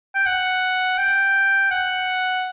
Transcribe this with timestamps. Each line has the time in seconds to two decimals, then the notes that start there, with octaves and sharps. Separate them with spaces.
0.15 G5
0.26 F#5
0.98 G5
1.71 F#5